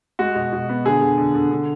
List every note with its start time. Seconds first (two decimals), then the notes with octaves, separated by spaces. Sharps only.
0.19 G#3 F#4
0.36 B2
0.53 B2
0.69 B3
0.85 D3 G#4
1.02 D3
1.18 D3
1.35 D3
1.51 D3